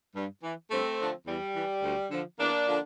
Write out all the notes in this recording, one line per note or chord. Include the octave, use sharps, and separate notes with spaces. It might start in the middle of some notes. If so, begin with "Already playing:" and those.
G2
E3
G2 A3 C4
D3 F3
E2 G3
E3
D2
D3 F3
E2 A#3 D4
D3 F3